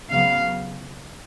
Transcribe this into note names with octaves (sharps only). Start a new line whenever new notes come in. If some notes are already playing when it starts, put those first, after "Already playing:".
C#3 F#3 B3 F5